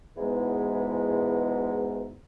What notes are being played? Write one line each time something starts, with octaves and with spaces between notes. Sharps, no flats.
E2 G#2 B2 E3 G#3 B3